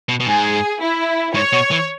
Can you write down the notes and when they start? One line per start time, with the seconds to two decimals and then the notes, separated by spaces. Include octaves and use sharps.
0.09 B2
0.20 B2
0.26 G#2 G#4
0.81 E4
1.35 G#2 C#5
1.53 B2
1.71 E3